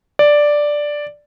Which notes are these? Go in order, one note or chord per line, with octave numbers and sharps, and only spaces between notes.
D5